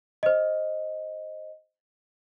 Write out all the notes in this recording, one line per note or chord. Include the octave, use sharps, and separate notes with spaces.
C5 D#5